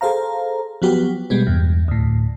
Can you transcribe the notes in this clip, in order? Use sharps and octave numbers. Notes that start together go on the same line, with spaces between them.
G#4 A4 C5 F5 A#5
F3 F#3 B3 F#4 G4
B2 G3 G#3 B3
E2 G2
D2 A2